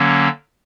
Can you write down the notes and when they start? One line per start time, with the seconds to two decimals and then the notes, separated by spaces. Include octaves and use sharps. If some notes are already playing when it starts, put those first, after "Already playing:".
Already playing: D3 F#3 A#3 C#4